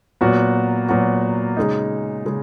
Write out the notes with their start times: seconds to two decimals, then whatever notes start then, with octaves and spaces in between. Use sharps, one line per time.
0.21 A#2 F#3 B3 F#4
0.89 A#2 F#3 B3 F#4
1.57 C#3 G#3 D#4
2.26 C#3 G#3